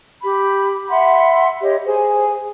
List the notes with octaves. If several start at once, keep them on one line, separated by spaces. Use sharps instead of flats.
G4 B5
E5 F#5 B5 C6
G4 C#5 D#5
G#4 C5 G#5